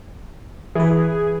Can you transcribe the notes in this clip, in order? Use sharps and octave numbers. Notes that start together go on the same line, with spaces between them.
E3 G#4 B4